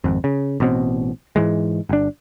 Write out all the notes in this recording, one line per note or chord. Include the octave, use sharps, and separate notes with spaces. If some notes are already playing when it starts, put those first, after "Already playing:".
G#1 F2
C#3
A1 B2 C4
G#2 E3 G#3
G1 D4